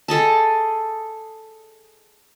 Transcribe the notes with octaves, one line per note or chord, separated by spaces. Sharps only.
G#4 A4 D#5 A5